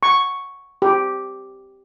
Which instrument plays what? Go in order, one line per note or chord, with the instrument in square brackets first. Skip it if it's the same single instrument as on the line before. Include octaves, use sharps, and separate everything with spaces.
[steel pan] C#6
G4